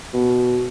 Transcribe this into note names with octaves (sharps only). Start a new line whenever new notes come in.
B2